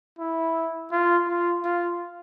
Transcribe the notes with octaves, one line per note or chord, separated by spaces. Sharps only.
E4
F4
F4
F4